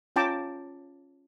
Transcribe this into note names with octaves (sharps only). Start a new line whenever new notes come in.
C#4 F4 G5 A5 A#5 D6